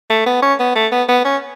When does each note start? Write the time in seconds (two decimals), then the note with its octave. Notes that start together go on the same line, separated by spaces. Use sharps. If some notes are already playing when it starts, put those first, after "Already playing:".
0.10 A3
0.26 B3
0.42 C#4
0.60 B3
0.75 A3
0.92 B3
1.09 B3
1.25 C#4